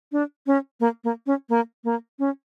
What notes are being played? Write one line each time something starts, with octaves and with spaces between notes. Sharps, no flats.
D4
C#4
A#3
A#3
C#4
A#3
A#3
C#4